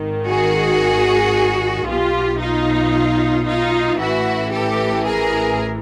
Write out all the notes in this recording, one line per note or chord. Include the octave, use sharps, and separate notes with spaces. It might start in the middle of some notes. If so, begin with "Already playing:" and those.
Already playing: G#1 G#2 D#3
F#4 G#4
B1 B2 F4 G4
D#4 F4
D#4 F4
A1 A2 E3 E4 F#4
G4 A4
G#4 A#4